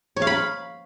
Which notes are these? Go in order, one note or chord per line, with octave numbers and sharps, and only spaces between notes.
C#5
F5
B5